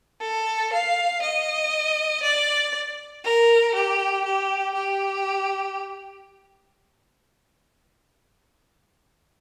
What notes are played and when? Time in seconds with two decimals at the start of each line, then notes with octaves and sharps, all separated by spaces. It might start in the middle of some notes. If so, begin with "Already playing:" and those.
0.22 A4
0.73 F5
1.22 D#5
2.23 D5
3.24 A#4
3.75 G4
4.25 G4
4.75 G4